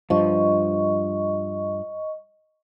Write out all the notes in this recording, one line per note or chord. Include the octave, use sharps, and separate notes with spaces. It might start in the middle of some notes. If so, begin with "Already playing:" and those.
G2 F3 D#5 C#6